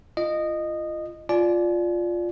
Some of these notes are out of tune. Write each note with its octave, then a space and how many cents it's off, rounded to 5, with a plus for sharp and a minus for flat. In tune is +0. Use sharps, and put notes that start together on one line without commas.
F4 -30 D#5 -15
F4 +0 D5 +0 G#5 +40